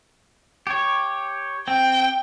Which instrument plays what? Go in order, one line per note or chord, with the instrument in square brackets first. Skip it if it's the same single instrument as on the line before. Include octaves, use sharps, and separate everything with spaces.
[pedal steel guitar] G4 C#5
[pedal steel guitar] C4 [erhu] G5